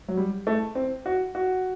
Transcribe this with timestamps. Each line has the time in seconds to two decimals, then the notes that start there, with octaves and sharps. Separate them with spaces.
0.08 F#3
0.17 G3
0.47 A3
0.75 C4
1.06 F#4
1.35 F#4